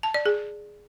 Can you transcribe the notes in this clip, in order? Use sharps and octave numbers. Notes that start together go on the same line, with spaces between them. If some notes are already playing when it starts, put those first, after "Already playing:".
A5
D5
G#4